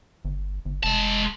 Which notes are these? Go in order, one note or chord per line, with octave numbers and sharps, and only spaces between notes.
G1
G1
F1 G#3 A5